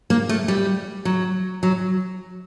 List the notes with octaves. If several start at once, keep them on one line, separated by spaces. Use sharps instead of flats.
A#3
A3
G3
F#3
F#3